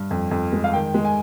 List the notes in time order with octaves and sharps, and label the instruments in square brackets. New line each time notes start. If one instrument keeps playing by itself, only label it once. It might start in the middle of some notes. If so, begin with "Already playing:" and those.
Already playing: [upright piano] G2
F2
F2
G#3
F5
D#3 G5
G#3
G#5